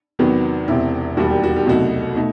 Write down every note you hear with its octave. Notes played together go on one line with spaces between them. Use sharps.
E2 C3 D#3 F#3 B3
E1 E2 C3 C4 E4
E1 D#2 D#3 G3 F#4
G4
F#4
G4
C2 B2 F#3 A3 D#4 F#4
B2 A3 D#4